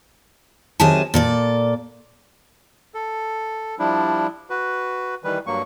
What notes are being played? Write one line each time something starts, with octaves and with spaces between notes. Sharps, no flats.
C3 D#3 F#3 G#4 G#5 A5
A#2 A4 D5
A4
F3 G3 D4 E4
F#4 B4
D#3 E3 G3 B4
G2 F#3 A#3 C#6